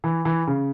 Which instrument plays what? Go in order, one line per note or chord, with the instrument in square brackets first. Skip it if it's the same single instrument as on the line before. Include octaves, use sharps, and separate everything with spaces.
[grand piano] E3
E3
C#3